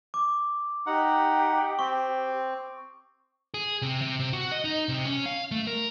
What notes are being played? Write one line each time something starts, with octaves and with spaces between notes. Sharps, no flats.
D6
D#4 G4 F#5
C4 C#6
G#4
C3
C3
C3
F#4
D#5
D#4
C3
C#4
F5
A3
A#4